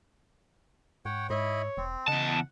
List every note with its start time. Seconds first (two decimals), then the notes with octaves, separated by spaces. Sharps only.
1.05 G#2 C#5 F#5 G5
1.30 G#2 E4 C#5 D#5 B5
1.77 E1 C4
2.08 E2 C#3 D#5 F#5 A5